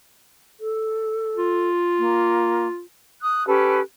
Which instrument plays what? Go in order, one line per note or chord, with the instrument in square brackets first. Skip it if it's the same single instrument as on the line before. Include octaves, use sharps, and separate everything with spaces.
[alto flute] A4
[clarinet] F4
[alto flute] A#3
[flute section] D#6 F#6
C#4 G4 A4 B4